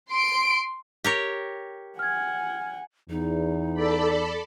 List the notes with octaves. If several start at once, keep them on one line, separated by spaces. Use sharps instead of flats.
C6 D7
G4 A#4 C#5
F#5 G#5 F6 G#6
E2 D#4
A4 D5 B5